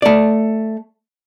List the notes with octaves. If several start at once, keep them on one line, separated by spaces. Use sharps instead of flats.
A3 D5